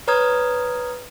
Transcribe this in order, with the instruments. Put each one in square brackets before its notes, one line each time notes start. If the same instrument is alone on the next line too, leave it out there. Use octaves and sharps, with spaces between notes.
[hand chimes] B4 C#5 A#5 D#6 F6 G#6